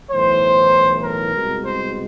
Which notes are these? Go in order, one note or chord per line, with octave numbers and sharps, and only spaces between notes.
B1 A2 E3 C5
A#4
C2 B2 G#3
C5